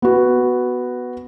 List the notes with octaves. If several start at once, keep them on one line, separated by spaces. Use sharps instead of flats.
B3 F#4